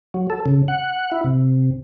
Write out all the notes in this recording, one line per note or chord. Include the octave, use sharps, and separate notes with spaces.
F#3
A4
C#3
F#5
E4
C3